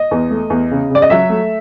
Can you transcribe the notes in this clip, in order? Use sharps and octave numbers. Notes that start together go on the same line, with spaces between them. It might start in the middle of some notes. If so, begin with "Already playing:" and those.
Already playing: D#5
E2
A3
E2
C#3
C#3 D5
D#5
F#3 E5
A3